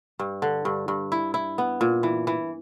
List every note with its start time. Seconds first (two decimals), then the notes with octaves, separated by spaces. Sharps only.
0.19 G2
0.42 D3
0.65 G2
0.88 G2
1.12 E4
1.34 E4
1.58 B3
1.81 A#2
2.03 E3
2.27 E3